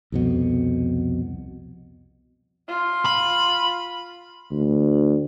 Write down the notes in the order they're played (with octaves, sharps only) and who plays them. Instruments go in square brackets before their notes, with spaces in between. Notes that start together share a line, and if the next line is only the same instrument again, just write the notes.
[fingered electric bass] C2 F2 B2
[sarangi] F4
[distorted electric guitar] B5
[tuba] D2